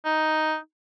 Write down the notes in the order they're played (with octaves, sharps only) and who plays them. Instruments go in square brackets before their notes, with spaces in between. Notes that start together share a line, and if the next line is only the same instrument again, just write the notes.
[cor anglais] D#4